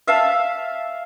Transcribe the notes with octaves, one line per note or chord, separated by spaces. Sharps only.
E5 F5 A5